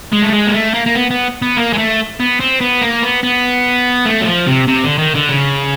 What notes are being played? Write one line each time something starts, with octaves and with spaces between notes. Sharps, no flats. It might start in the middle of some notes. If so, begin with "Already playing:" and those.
G#3
A3
G#3
A#3
A3
A#3
A#3
B3
B3
B3
A#3
G#3
A3
B3
C4
B3
A#3
B3
B3
A3
F#3
F3
C3
C3
D3
D#3
D3
C#3